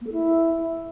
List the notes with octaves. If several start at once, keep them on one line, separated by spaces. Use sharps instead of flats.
A#3
A4
E4